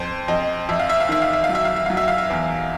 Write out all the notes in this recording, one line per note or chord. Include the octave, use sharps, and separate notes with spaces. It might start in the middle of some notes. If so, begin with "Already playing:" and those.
Already playing: F2 C5
F2 D#5
F2 E5
F5
E5
F5
D#3 E5
F5
E5
F5
F#3
E5
F5
E5
F#3 F5
E5
F5
E5
E2